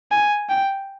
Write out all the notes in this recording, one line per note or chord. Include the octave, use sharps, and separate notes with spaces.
G#5
G5